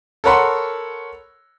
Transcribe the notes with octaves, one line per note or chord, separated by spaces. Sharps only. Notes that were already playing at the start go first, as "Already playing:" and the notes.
A4 A#4 C#5 F#5 B5 C6